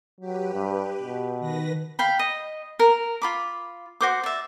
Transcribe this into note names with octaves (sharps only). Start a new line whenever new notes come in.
F#3 G4 B4
G2
B2
D#3 B4 A#6
F5 G5 B5
D#5
A#4
F4 B5 D6
F#4 C5 D6
D5 E5